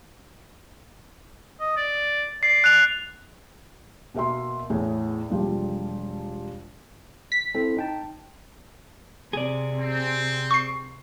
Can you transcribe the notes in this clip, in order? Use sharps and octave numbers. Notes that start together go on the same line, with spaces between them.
D#5
D5
D5 C7
F#6 F7
B2 A#3 A#4 E5 C6
E2 A2 G#4
E1 F3 G3 A#3
B6
C4 E4 A4
D#4 G5 A5
C3 G#4 D5
C4
C#6 C7